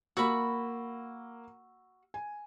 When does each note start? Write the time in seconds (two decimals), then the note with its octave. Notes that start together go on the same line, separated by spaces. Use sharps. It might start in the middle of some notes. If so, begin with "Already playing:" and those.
0.17 A#3 F#4 B5 E6
2.14 G#5